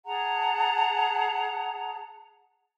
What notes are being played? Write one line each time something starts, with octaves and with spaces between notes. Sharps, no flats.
G#4 F#5 A5 A#5